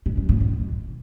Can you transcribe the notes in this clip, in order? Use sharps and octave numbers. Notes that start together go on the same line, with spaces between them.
B2
F#2
A2
B2